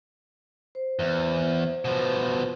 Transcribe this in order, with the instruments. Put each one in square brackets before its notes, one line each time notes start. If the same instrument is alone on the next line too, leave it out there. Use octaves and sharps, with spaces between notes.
[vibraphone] C5
[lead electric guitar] E2
[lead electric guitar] B2 F3 [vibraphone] B4 C5